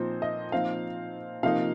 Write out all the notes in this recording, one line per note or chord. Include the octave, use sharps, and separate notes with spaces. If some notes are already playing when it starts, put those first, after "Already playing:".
Already playing: A#2 F3 C4 D#4 C5
D#5
A#2 F3 C4 D#4 F5
C3 F3 A#3 D#4 F5